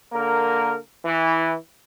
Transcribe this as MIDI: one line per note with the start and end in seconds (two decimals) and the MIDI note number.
0.13 0.77 50
0.13 0.77 58
0.13 0.77 70
1.05 1.55 52